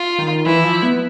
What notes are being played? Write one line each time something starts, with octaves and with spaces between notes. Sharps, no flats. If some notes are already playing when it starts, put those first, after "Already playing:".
Already playing: F4
D#3
E3 E4
F3
B3